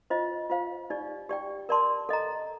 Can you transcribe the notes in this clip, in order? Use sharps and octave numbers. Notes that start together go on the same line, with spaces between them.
F4 C5 D#5
F4 C5 F5
D#4 G4 D5
G4 D5 G5
A#4 D5 A5 C6
A4 D#5 A#5